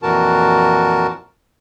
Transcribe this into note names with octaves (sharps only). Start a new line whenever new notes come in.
F2 A#2 E3 F#4 A#4 A5